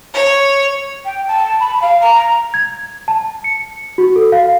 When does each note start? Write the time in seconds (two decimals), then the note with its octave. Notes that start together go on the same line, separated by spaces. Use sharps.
0.13 C#5
1.05 G5
1.27 A5
1.59 B5
1.82 F5
2.01 A#5
2.54 G#6
3.08 A5
3.44 C#7
3.98 F#4
4.16 A4
4.32 F5